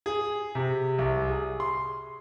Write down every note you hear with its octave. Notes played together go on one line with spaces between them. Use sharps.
G#4
C3
C2
G#4
C6